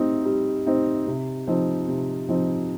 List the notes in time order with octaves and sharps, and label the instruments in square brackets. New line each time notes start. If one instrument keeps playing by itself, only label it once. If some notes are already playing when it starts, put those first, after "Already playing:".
Already playing: [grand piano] G3 C4 D#4
G3
C4 D#4
C3
F3 C4 D#4
C3
F3 C4 D#4